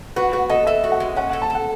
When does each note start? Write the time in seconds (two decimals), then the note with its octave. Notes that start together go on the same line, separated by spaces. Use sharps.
0.16 F#4 B4
0.33 F#4 B4
0.49 A4 D#5
0.67 A4 E5
0.84 F#4
0.92 F#5
1.00 G#3
1.16 C#4 F#5
1.30 A4 F#5
1.42 A5
1.50 A4 F#5